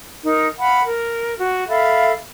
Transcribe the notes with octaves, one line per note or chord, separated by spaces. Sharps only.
D#4 A#4
F5 F#5 B5
A#4
F#4
A4 E5 F5 B5